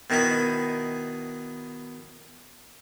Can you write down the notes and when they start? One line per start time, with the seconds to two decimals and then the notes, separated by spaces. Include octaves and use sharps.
0.10 B2 D#3 D#4 E4 B5